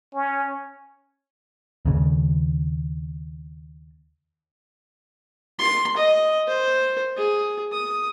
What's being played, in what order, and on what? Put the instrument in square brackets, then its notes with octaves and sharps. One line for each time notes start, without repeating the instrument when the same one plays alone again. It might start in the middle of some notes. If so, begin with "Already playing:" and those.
[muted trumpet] C#4
[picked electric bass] D#2 C#3
[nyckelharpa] C6
D#5
C5
G#4
D#6